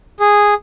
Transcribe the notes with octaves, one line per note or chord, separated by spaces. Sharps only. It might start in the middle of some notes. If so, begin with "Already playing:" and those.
G#4